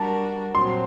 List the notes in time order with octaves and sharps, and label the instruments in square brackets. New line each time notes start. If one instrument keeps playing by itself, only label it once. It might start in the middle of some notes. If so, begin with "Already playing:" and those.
Already playing: [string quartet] G3 D4 F#4 A#4 [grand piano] A5
[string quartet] A#2 F#3 C4 [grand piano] C6